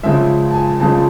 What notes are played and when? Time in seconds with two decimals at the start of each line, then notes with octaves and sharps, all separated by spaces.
0.03 C#2 C#3 F3 G#3 E5
0.51 A5
0.54 G#5
0.80 C#2 C#3 F3 G#3 A5